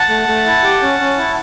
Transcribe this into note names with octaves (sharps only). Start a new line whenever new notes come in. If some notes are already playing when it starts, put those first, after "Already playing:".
Already playing: F#5 A5
A3
A3
E4
G4
C#4
C#4
E4